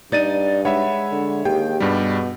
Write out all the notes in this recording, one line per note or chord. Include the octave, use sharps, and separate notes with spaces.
G2 D#4 D5 A6 D#7
G#3 C#5 E5 F#5 B5
D3
D#2 G4 G#4 G5
G2 B2 G3